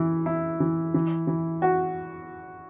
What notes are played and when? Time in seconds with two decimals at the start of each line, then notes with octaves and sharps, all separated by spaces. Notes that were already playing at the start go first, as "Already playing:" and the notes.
Already playing: E3 E4
0.26 E4
0.60 E3
0.94 E3
1.27 E3
1.62 F#4